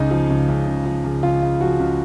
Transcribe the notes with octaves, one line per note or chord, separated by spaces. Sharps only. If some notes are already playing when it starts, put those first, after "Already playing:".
Already playing: C#2 C#3 D#4
F3
C#2
C#2
C#3
F3
C#2
C#2 F4
C#3
F3 F#4
C#2